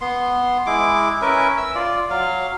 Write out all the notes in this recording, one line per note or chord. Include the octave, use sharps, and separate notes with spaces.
B3 C6
G#3 E4 D6
C#4 A#4 B4 E5
E6
F4 D5
F#3 F5